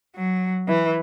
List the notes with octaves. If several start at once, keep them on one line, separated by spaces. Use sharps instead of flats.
F#3
E3